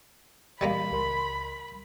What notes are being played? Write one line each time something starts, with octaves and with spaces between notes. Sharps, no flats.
A#2 E3 G3 G#3 A#3 B5
C#2 A#4 C6